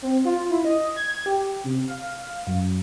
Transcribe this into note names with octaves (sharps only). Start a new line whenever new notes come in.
C4
F4
E4
D#5
G#6
G4
C3
F5
F#2